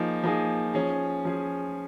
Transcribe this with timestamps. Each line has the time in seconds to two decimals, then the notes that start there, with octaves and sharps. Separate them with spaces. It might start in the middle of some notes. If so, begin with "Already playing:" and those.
Already playing: F3 A#3 D#4 G#4
0.23 F3 A#3 D#4 G#4
0.74 F3 C#4 G#4
1.25 F3 C#4 G#4